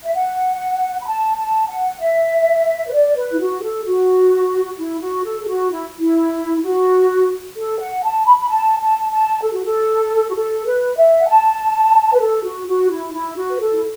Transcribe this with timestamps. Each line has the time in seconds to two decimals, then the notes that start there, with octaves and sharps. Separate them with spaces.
0.04 E5
0.14 F#5
1.01 B5
1.07 A5
1.37 A5
1.69 F#5
2.00 E5
2.87 B4
2.93 D5
3.16 B4
3.32 E4
3.39 F#4
3.62 A4
3.86 F#4
4.79 E4
5.01 F#4
5.25 A4
5.42 A4
5.48 F#4
5.71 E4
5.99 E4
6.64 F#4
7.57 A4
7.80 F#5
8.03 A5
8.26 B5
8.41 B5
8.49 A5
8.80 A5
9.11 A5
9.42 A4
9.54 F#4
9.65 A4
10.30 F#4
10.35 A4
10.66 B4
10.97 E5
11.19 F#5
11.28 A5
12.14 B4
12.20 A4
12.44 F#4
12.68 F#4
12.90 E4
13.13 E4
13.36 F#4
13.51 B4
13.60 A4
13.74 E4